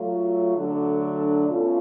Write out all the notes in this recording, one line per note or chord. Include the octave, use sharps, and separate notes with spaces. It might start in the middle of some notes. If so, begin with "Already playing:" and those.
Already playing: F#3 A3 F4
D3 F#3 A3 D4 F#4
B2 A3 C#4 F4